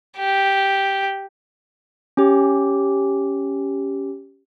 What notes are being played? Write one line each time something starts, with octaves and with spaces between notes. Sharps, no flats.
G4
C#4 G4